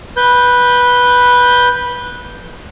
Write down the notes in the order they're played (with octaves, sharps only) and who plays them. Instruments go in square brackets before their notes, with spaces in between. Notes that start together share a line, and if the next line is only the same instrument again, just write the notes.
[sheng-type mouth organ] B4 G6